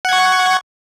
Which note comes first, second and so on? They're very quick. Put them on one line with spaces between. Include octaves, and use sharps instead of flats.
F#5 G#6 C#6